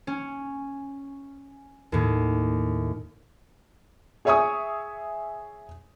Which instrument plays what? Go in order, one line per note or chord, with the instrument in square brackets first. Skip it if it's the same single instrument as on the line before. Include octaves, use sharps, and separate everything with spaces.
[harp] C#4
D#2 A2
[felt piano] G#4 C#5 E5 G#5 C#6 D#6